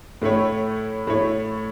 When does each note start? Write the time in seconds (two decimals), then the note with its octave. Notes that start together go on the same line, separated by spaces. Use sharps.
0.22 A2 A3 E4 C#5
1.07 A2 A3 E4 C#5